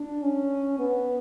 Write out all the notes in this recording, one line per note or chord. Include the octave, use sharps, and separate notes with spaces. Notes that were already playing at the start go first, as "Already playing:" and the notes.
Already playing: D4
C#4
B3